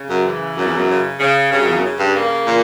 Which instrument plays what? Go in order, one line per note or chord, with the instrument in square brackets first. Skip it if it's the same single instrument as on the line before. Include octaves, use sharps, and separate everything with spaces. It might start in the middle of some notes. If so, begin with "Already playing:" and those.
Already playing: [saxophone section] C#3
[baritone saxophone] F#2
[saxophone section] E3
[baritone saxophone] F#2 [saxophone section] C#3
[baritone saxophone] E2
F#2
[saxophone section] C#3
C#3
[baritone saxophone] G2 [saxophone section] C#3
[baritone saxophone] F#2
E2
F#2
[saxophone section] C#3
[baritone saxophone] G2
[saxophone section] A#3
[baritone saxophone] A#2 [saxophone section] E3